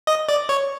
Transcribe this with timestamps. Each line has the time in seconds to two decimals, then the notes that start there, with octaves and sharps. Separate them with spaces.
0.07 D#5
0.29 D5
0.49 C#5